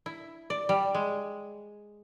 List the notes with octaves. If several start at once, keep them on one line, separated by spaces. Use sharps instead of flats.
E4
D5
G3
G#3